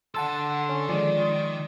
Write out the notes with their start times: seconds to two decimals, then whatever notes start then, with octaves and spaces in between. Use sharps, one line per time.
0.15 D3 A4 F#5 A5 C6 E6
0.69 C#4
0.89 D#3 F3 G#3 D5